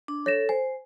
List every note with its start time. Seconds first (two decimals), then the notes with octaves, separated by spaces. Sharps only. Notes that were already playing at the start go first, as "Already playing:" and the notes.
0.08 D4
0.26 A4 C#5 A#6 E7
0.49 C5 G#5